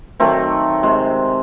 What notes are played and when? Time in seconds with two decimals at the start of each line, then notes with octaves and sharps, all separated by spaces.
0.20 D#3 F#3 A3 C4
0.83 C3 G#3